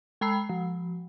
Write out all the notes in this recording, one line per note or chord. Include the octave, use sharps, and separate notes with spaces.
G#3 G5 A#5 B5 E6 C7
F3